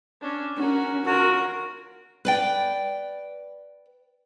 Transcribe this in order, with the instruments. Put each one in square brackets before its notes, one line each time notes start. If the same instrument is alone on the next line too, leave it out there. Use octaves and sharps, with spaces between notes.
[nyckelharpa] C#4 D4
[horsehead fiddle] C#4 [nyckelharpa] F#4 A#4
[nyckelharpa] F4 C#5 [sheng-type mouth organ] F#4 [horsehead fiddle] A#4
[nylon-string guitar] B4 D5 G5